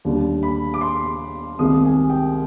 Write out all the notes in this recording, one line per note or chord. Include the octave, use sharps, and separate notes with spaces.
D#2 D3 G3
B5
D6
C6
C2 C3 D#3 G#3 D#6
G#5
G5